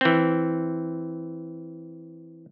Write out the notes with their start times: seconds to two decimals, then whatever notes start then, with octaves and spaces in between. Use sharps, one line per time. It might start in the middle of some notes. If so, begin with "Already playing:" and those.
0.01 E3 C4